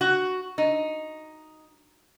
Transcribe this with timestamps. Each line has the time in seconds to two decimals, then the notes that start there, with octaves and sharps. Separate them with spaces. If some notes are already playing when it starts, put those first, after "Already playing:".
0.01 F#4
0.58 D#4